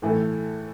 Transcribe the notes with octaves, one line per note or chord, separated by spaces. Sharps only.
A2 E3 A3